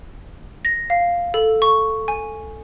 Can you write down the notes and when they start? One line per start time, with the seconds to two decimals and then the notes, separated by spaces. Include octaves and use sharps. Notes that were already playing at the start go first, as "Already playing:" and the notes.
0.65 A#6
0.90 F5
1.34 A4
1.62 C#6
2.08 G#5